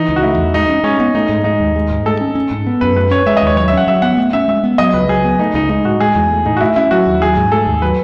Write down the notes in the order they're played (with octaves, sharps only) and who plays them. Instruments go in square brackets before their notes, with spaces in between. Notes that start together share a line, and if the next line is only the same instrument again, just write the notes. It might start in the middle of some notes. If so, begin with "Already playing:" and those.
Already playing: [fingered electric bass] E3 [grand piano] D#4
[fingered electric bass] C#2
[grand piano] F#4
[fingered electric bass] A3 [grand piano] E4
[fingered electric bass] E2
[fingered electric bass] G#3 [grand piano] D#4
[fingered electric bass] C#4
[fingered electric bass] G#3 [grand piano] C#4
[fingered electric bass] B3 [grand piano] D#4
[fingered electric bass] A3 [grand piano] D#4
[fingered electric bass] G#2
[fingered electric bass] G#3 [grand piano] D#4
[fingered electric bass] D#2
G#3
G#2
[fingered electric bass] A3 [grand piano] A4
[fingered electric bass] C#4
C#4
G#2
B3
[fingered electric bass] F#2 [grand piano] B4
[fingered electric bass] A3 [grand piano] B4
[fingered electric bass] C#4 [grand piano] C#5
[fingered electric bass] G#3 [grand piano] E5
[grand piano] D#5
[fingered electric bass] D#2 [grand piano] C#5
[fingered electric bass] F#3 [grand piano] C#5
[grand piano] E5
[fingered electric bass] C#4 [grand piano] F#5
[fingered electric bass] F#3 [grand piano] E5
[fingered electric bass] B3 [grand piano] F#5
[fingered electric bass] A3
[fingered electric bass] C#4 [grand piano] E5
[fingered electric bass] G#3 [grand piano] E5
[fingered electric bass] B3
[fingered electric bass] F#3 [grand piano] D#5
[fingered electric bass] C#2 [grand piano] B4
[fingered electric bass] F#3 [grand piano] G#4
[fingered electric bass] B3
[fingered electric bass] A3 [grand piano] D#4
[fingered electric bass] C#2 [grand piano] D#4
[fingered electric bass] G#3 [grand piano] D#4
[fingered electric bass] A2 [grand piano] F#4
[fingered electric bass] G#3 [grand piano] G#4
[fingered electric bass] E2
A3
[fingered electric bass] A2 [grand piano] D#4
[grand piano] F#4
[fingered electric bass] A3 [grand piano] E4
[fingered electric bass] C#4 [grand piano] E4
[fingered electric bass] F#3 [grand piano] F#4
[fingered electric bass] D#2
[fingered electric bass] F#3 [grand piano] G#4
[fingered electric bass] G#2
[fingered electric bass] A3 [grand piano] A4
[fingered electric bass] D#2
[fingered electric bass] F#3 [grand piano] B4